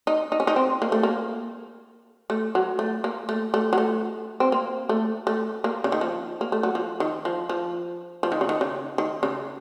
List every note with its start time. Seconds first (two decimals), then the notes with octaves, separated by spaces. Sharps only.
0.07 D#4
0.32 D#4
0.40 C#4
0.47 D#4
0.56 C4
0.82 A#3
0.92 A3
1.03 A#3
2.30 A3
2.55 F#3
2.79 A3
3.04 A#3
3.29 A3
3.54 A3
3.73 F#3
3.78 A3
4.40 C4
4.52 A#3
4.89 A3
5.27 A3
5.64 A#3
5.84 C#3
5.92 D#3
6.01 F3
6.41 A#3
6.52 A3
6.63 F#3
6.75 F3
7.00 D#3
7.25 F3
7.49 F3
8.23 F3
8.32 D#3
8.41 C#3
8.49 D#3
8.61 C#3
8.98 D#3
9.23 C#3